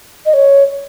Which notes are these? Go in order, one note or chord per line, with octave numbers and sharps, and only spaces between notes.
D#5
C#5